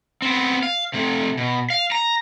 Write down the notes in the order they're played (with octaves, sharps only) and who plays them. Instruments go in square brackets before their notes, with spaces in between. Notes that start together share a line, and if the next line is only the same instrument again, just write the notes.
[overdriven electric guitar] B3 C4
F5
C3 A3
B2
F5
A#5